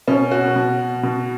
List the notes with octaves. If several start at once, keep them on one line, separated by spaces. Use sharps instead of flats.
B2 C#4
F#4
B2
B2